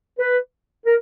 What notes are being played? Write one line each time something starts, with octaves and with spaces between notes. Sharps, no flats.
B4
A#4